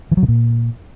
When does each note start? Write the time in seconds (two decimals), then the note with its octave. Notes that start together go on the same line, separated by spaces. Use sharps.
0.11 E3
0.17 F#3
0.23 C3
0.28 A#2